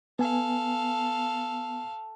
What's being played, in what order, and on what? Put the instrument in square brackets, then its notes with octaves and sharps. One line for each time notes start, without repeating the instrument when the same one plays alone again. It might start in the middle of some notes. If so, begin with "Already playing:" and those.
[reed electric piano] B3 G#5 [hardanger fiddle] A4 F5